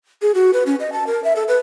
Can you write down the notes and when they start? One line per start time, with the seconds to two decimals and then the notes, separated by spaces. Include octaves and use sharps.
0.22 G#4
0.34 F#4
0.53 B4
0.66 C#4
0.80 D#5
0.92 A5
1.07 A#4
1.24 E5
1.36 A4
1.48 B4